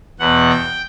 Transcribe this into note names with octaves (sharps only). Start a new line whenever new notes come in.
E2 B2 F#5
G5